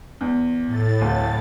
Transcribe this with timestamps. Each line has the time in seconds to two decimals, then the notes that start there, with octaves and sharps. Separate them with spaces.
0.21 E2
0.67 A2 A6
1.01 D1